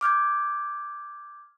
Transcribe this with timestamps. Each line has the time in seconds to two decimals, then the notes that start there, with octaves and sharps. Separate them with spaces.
0.01 D6 F6 G6 G#6